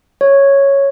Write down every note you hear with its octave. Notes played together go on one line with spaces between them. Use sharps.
C#5